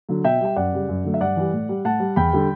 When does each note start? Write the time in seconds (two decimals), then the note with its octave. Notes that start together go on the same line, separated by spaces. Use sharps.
0.09 D3 F#3
0.24 B2 E5 G5
0.41 G3 G5
0.56 F#2 D5 F#5
0.72 C#3 G3
0.89 F#2
1.05 D3 F#3 A3
1.14 E5
1.21 G2 D5 F#5
1.36 E3 G3
1.53 A2
1.69 G3
1.85 A2 F#5 A5
2.00 G3
2.16 E2 G5 B5
2.33 D3 G3